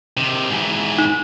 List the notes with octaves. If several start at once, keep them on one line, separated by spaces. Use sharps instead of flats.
C3 D#3
G#2 E3
D#4